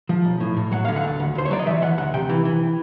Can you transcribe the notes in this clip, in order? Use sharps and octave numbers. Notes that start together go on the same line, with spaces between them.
F3
B1
A2
A2
F#3 F#5
D3 F5
F#5
D2
D2
D2 C5
C#5
F#3 D5
D#5
E3 E5
E3 F#5
D2 F#5
C3 G5
E3
E3